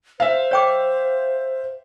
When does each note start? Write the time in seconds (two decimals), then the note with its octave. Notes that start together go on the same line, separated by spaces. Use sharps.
0.20 C5 E5 F5
0.51 C#5 G5 D6